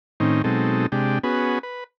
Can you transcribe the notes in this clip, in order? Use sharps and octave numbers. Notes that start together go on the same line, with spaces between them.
A2 D#3 C4 C#4 D#4
B2 F#3 G#3 C4 D#4 A4
C3 G#3 D4 G4
B3 C#4 F#4 G#4 B4
B4